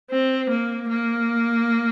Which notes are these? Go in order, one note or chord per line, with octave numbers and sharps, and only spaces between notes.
C4
A#3
A#3